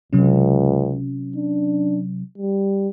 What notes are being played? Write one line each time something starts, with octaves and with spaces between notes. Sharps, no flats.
C#2 C3 F#3 C#4
D4
G3